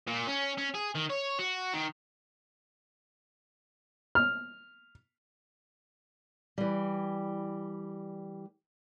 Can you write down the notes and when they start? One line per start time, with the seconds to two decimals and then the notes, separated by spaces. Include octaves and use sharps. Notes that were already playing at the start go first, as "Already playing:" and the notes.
0.07 A#2
0.27 C#4
0.58 C#4
0.74 G#4
0.95 D#3
1.10 C#5
1.39 F#4
1.74 D#3
4.15 F6
6.58 E3 G3